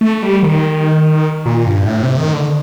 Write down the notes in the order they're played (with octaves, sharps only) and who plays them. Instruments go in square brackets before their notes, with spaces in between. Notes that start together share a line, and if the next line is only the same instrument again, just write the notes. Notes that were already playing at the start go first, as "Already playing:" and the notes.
[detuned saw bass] A3
G3
D#3
A#2
G2
A2
C3
D#3
D3